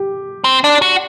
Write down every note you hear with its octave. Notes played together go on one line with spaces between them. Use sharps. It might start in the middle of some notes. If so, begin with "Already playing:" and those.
Already playing: G4
C4
D4
F#4